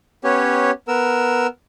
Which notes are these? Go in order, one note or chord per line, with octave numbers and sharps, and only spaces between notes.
B3 C#4 G4 C#5
B3 A#4 E6